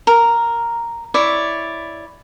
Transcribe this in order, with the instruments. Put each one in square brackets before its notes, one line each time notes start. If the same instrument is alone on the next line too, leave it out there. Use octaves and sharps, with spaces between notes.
[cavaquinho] A#4
E4 C#5 D5